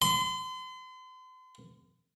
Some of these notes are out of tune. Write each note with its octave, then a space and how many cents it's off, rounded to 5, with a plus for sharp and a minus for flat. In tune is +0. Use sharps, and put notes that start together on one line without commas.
C6 -40